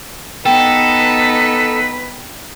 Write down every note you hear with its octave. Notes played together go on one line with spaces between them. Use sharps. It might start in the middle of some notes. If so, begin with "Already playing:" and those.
B3 D#4 A4 B4 G5 E7